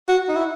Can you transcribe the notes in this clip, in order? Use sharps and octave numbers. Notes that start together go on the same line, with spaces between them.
F#4
D#4
E4